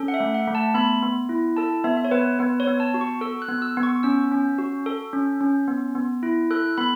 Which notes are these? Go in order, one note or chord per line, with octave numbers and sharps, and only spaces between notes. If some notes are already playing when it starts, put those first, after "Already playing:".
Already playing: C#4 A4
F#5
E5
A3
F#5
A3
A5
B3 B5
B3
E4
A4 A5
B3 E5
E5
C#5
B3 B4
B3 B4
C#5
B3
A5
F#4
C#6
A4 E6
F#6
B3
E6
B3
C#6
C#4 E6
C#4
F#4
A4
C#4
C#4
B3
B3
E4
A4 F#6
B3 B5